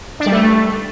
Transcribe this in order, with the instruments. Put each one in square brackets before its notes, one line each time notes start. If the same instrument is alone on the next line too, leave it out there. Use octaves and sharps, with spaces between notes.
[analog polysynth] D4
G3
A3